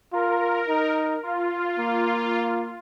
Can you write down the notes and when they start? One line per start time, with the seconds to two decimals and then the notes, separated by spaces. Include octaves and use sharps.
0.13 F4 A#4
0.68 D#4
1.23 F4
1.79 A#3